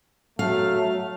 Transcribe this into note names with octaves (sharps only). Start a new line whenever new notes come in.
F#3 A3 F5